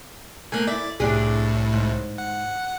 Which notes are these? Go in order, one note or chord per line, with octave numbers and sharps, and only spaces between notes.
A3 A#3 G#5 F#6 G#6
E4 D5 E5
C2 A2 D4 G4 G#4
G#2
F#5